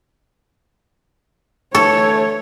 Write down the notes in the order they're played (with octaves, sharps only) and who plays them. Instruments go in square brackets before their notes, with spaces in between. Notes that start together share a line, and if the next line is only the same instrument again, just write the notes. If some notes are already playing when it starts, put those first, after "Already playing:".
[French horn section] D3 E3 A3 [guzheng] A4 [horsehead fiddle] C#5 [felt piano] C#6